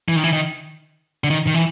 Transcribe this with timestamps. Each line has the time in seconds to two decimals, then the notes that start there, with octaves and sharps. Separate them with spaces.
0.08 E3
0.16 D#3
0.24 E3
0.33 D#3
1.24 D3
1.30 D#3
1.47 D#3
1.54 E3